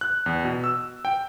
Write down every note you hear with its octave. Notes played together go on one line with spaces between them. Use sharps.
F#6
E2
B2
E6
G5